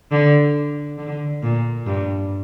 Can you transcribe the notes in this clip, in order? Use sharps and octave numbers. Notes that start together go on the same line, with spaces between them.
D3
D3
A#2
G2